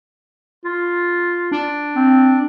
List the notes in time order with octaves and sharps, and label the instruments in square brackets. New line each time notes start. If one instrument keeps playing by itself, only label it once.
[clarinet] F4
[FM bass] D4
[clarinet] C4